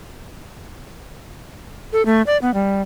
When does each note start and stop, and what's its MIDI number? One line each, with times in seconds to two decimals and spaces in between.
1.93 2.05 69
2.06 2.22 57
2.27 2.37 74
2.42 2.53 59
2.54 2.82 55